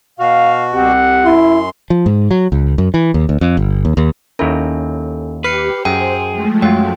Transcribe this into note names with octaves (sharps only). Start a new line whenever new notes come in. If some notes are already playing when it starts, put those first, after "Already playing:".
B2 F#4 F5
C2 C4 G4 F#5
F#2 E4 C6
F3
G#2
F#3
C#2
F#2
E3
D#2
D2
F2
G1
D#2
D#2
D#2 C#4 E4 A4 A#4
G4 B4 F6 C7 C#7
F#2 G#4 C5 G5
F3 G#3 A3
F#2 F#3 F4 G5